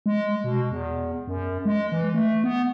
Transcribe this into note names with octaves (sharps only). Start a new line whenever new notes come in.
G#3
B2
E2
F#2
G#3
E3
A3
B3